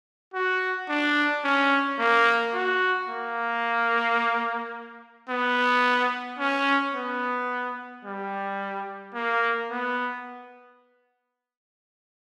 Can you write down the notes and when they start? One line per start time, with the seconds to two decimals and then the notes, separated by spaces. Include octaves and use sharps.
0.34 F#4
0.89 D4
1.44 C#4
1.99 A#3
2.54 F#4
3.09 A#3
5.29 B3
6.39 C#4
6.94 B3
8.05 G3
9.14 A#3
9.71 B3